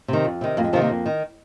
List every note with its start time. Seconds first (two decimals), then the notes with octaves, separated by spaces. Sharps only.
0.08 C3 D#3
0.25 F2
0.41 C3 D#3
0.57 F2 A#3
0.64 G#3
0.73 C3 D#3 F3
0.81 A#3
0.89 F2
1.06 D#3